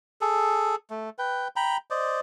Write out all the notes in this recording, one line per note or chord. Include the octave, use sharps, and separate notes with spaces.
G#4 A4
A3
B4 G5
G5 A#5 B5
C5 D5 D#5